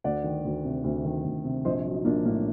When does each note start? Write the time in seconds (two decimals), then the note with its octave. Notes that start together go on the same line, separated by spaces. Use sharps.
0.04 D2 D5 F#5
0.24 D#3
0.44 D2
0.64 C3
0.84 D2
1.04 D#3
1.24 D2
1.45 C3
1.65 A#1 C5 D#5
1.86 F#3
1.93 D#4
2.05 A#1 A#3 D4
2.25 A2 A#3